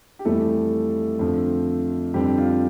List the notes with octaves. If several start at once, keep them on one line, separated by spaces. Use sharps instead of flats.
G4
F2 E3 G3 A3 A4
F2 D3 F3 C4
F2 D3 G3 C4 G4
F4